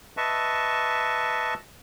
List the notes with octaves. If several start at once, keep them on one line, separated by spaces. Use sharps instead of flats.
B4 D#5 E5 A5 C#6